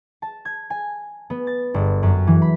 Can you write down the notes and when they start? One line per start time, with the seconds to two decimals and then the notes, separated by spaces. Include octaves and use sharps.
0.22 A5
0.45 G#6
0.70 G#5
1.30 B3
1.47 A6
1.74 G1
2.03 F#2
2.27 E3
2.42 B5